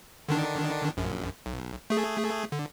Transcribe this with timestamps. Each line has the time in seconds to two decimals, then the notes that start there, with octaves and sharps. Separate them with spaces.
0.29 D3 D#3 D4
0.97 A#1 F#2
1.46 B1
1.90 A3 G#4
2.52 D3